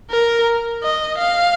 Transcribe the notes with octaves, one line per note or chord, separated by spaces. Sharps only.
A#4
D#5
F5